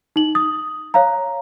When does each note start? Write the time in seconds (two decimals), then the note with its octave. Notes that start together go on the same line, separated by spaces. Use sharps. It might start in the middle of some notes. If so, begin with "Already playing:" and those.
0.16 D#4 F#7
0.35 D#6
0.94 C#5 F5 A#5